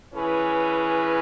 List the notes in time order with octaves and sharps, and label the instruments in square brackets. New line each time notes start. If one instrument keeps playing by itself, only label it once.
[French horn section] E3 C#4 E4 G#4 B4